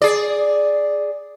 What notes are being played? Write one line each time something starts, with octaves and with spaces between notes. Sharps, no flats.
G#4 D5